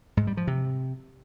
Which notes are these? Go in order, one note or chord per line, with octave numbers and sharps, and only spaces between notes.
G#2
G3
F3
C3